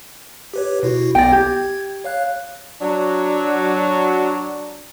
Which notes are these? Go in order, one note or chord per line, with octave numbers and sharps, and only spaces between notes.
G4 B4 C#5
B2 E4 F#4
B1 B3 D5 G5 A#6
G4 G#6
C#5 F5 F#6
F#3 D4